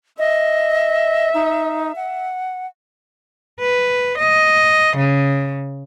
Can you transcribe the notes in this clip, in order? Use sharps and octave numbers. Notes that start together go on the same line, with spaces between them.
D#5 E5
D#4
F#5
B4
D#5
C#3